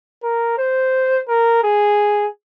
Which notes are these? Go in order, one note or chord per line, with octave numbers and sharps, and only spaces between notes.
A#4
C5
A#4
G#4